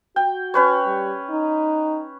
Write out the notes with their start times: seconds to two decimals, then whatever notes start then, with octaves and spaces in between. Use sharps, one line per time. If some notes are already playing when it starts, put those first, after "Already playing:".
0.16 F#4 G5
0.54 C#4 B4 C#5
0.86 G3
1.31 D#4